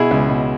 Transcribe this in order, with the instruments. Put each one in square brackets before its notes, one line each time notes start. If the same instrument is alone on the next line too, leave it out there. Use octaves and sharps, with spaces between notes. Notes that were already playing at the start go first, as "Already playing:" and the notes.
Already playing: [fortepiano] B2 E4 G#4
C#2
B2